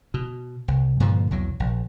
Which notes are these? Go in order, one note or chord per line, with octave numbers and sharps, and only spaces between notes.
B2
C2
G2 A#2 D3 F3
B1 E2 F#3
A#1